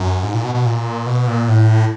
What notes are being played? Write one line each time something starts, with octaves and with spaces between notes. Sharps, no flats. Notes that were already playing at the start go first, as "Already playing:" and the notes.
Already playing: F#2
G#2
A#2
B2
B2
A#2
B2
A#2
A2